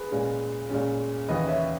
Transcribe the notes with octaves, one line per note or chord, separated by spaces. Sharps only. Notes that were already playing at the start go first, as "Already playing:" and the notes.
Already playing: G#4 B4
A#2 G#3 C#4
A#2 G#3 C#4
D#2 C#3 E3 B4 D#5
C#5 E5